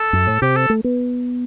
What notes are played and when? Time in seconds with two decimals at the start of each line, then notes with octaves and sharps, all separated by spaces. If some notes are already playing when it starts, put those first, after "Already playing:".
Already playing: A4
0.13 F#2
0.27 A2
0.42 C3 G4
0.56 A4
0.70 A3
0.84 B3